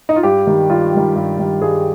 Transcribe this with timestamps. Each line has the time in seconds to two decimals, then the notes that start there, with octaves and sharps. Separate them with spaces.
0.09 D#4
0.16 F4
0.23 G2 G4
0.47 D#3 G3
0.69 G2 F4
0.93 D#3 G3
1.15 G2
1.39 D#3 G3
1.61 G2 G#4